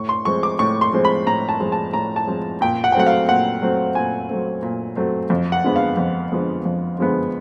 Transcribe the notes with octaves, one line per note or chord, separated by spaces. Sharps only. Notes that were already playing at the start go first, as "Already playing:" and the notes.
Already playing: A2 C#6
C6
F3 G#3 C4 C#6
D6
A2 C#6
C6
F3 G#3 C4
B5
A2 A#5
A5
F3 G#3 C4
A5
A2 A#5
A5
F3 G#3 C4
A#2 G5
F#5
G5
F#3 A3 C4 F#5
F5
A#2 F#5
F#3 A3 C4
A#2 G#5
F#3 A3 C4
A#2
F#3 A3 C4
F2
F#5
D3 F3 G#3 B3
F5
F2
D3 F3 G#3 B3
F2
D3 F3 G#3 B3